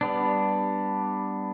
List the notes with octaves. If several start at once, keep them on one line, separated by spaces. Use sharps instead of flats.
G3 B3 D4